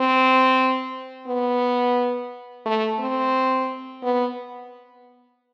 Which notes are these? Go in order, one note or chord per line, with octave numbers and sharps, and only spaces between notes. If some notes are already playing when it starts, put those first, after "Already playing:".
Already playing: C4
B3
A3
C4
B3